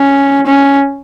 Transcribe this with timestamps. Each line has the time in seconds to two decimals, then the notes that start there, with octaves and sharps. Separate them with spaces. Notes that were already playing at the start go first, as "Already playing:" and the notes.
Already playing: C#4
0.47 C#4